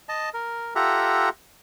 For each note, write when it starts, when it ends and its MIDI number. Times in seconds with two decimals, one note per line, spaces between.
0.09 0.29 75
0.09 0.29 81
0.34 0.74 70
0.75 1.29 65
0.75 1.29 67
0.75 1.29 69
0.75 1.29 76
0.75 1.29 78
0.75 1.29 82